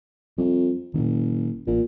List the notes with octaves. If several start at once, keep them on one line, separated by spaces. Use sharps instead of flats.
F2 G3 C4
F#1 A#2 D#3
A1 A#2